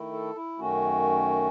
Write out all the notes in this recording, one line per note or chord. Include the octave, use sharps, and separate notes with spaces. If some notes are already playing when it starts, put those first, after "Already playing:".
Already playing: D#3 A3 E4
A4
E4
F#2 D#3 A3 C#4 F#4